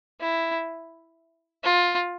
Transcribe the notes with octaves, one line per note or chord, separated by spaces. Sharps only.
E4
F4